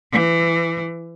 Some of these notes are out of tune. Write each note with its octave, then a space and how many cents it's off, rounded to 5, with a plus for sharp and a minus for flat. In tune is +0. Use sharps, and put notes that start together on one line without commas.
E3 +25